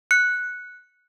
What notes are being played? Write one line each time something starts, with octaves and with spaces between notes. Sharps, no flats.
F#6 C#7